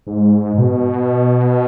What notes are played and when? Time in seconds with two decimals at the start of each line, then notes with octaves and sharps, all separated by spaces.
0.07 G#2
0.58 B2